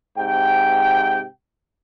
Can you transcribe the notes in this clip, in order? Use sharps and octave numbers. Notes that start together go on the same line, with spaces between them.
G#2 C3 G5